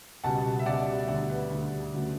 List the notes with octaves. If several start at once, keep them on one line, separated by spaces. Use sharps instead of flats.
C#2 B2 G3 F#5 A5
E5
C#2 B2 G3 D5 F#5
E5
D2 D3 G3 D5 F#5
B4
D2 D3 G3
D2 C#3 F#3 A3